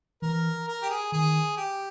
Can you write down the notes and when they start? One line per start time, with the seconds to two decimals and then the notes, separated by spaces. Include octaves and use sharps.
0.22 E3 A#4
0.68 A#4
0.83 G4
0.90 G#4
1.12 D#3 G#4
1.57 G4